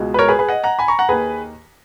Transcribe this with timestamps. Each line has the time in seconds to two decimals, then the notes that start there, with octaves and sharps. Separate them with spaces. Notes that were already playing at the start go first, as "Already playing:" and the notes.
Already playing: C#2 B2 G#3
0.14 B4
0.19 A#4 C#5
0.28 G#4 B4
0.39 G#4 B4
0.49 D#5 F#5
0.64 F#5 A#5
0.79 G#5 B5
0.88 A#5 C#6
0.99 F#5 A#5
1.08 D#2 D#3 A#3 G#4 B4